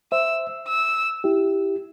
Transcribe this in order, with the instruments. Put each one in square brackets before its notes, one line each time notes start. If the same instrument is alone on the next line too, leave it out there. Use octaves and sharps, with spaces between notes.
[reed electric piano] C5 E5 [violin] E6
[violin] E6
[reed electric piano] E4 G4